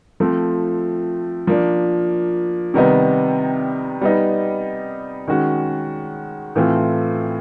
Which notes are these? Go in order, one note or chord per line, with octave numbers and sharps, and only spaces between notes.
F3 A3 C4
F3 A#3 D4
C3 D#3 G3 B3 D#4
G3 B3 D#4
D#3 G#3 C#4 F#4
A2 E3 A3 C4 F4